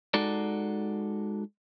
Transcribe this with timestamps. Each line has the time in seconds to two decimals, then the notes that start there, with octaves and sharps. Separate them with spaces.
0.14 G#3 D#4 F#4 A4 D5